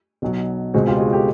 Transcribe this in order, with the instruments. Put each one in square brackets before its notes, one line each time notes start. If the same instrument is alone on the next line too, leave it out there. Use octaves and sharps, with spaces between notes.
[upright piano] B1 B2 F#3
C#2 B2 G#3 C4 F#4 G#4
F4 G4
F#4 G#4
G4 A4